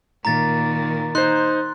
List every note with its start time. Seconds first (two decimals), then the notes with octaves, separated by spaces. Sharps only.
0.25 A#2 D#3 A#5 A6
1.15 D#4 C5 C6 F#6